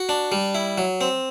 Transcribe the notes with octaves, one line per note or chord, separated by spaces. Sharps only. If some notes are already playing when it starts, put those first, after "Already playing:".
Already playing: F#4
D4
G3
E4
F#3
C4